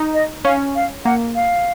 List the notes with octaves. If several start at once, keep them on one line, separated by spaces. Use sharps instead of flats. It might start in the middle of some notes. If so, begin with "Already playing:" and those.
Already playing: D#4
D#5
C#4 F5
F5
A#3 F#5
F5